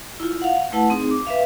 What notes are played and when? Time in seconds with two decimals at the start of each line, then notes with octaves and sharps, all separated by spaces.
0.20 E4 F4
0.42 F5 F#5
0.73 A3 E4 B4 F#5 A5
0.90 C4 D#4 G#4
1.11 D6
1.27 B4 E5 F5